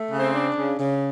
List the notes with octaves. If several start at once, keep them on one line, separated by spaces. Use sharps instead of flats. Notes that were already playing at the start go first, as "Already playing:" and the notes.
Already playing: A3
C#3
C4 C5
D4
C#3
C#3